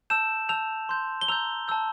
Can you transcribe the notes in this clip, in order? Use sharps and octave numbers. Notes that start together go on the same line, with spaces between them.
A5 E6 G6 E7
A5 E6 G6 F7
C6 G6
G7
A#5 E6 G6 F7
A5 E6 G6